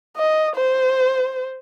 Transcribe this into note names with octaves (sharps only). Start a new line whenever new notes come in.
D#5
C5